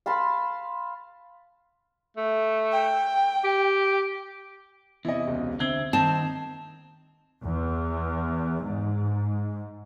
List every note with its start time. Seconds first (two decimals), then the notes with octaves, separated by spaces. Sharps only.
0.06 F5 A5 B5 C6
2.17 A3
2.72 G5
3.44 G4
5.05 E2 C3 E4 D#5
5.28 E1 C#2
5.60 D3 C4 E5 G#6
5.93 D#3 A#3 C4 D#4 A5
7.44 E2
8.63 G#2